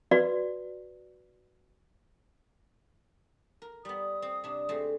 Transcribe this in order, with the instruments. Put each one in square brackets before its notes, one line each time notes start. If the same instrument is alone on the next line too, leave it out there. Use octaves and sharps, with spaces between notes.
[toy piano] F#4 B4 D5
[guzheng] A#4
[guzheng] G3 B3 [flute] D#6
[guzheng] C4
C3 D4
G#3 A3 C4